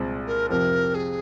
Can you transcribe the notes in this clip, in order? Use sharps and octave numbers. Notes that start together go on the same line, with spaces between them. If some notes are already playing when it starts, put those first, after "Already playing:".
Already playing: C2 A#2 G#3 C4
A#4
F2 C3 F3 A#4
G#4